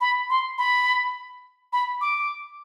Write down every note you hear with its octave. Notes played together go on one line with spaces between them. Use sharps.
B5
C6
B5
B5
D6